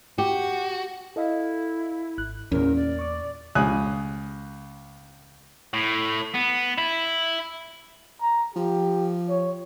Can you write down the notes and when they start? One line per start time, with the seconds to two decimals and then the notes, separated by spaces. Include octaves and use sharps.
0.18 F#4 G4
1.16 E4 A4 D#5 F5
2.18 G#1 F#6
2.52 E2 A#2 C#4 A#4
2.76 D5
2.99 C#6 D6
3.55 C#2 G#5 D#6 F#6
5.73 A2
6.35 B3
6.78 E4
8.22 A#5
8.56 F3 G4
9.29 C#5